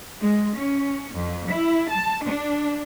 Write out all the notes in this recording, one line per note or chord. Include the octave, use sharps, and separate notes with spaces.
G#3
C#4
F2
E4
A5
D4